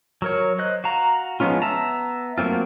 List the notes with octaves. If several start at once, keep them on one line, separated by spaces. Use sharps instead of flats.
F#3 A#4 C#5
C5 D#5 F#6
F#4 F5 A#5
F3 G#3 B3 C#4 F4
B3 E5 A5 A#5
F#3 A3 A#3 C4 F4